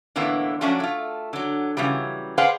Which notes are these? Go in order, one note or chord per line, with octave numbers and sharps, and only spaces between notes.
A2 D3 E3 A#3 B3
F3 F#3 A3 C#4 D4 F#4
A3 F4
D3 F#3
C#3 E3 F#3 G3
G#4 B4 C5 D5 F5 F#5